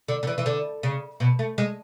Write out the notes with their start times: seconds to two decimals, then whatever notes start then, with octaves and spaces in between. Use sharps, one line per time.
0.08 D3
0.23 D3
0.27 E3
0.38 E3
0.46 D3
0.83 C#3
1.20 B2
1.39 A3
1.58 G#3